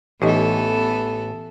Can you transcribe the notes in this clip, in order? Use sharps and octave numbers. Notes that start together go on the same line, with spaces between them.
A1 E3 B3 D#4 G4 A4 D#5